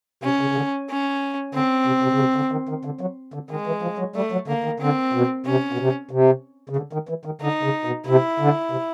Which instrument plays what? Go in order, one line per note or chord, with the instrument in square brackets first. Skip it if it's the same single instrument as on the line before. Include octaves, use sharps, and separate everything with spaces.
[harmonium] C3 [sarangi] C#4
[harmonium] C#3
C#3
D3
[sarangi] C#4
[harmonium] D3 [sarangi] C4
[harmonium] C3
C3
C#3
C3
D3
D#3
D#3
D3
F#3
D3
[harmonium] D#3 [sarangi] G#3
[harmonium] E3
F3
F#3
[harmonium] G3 [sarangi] A3
[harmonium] F#3
[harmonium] D3 [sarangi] A#3
[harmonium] D#3
[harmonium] D3 [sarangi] C4
[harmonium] B2
[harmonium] C3 [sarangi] C#4
[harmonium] B2
C3
C3
C#3
D3
D#3
E3
D#3
[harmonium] D3 [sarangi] D#4
[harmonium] C#3
B2
[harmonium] C3 [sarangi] E4
[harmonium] D3
C3